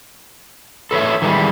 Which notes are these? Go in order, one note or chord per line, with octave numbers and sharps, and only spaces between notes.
A4 B4 C#5 E5
D#3 E3 G3 G#3